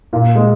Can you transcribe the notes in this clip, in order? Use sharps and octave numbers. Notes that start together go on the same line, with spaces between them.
A#2
G#3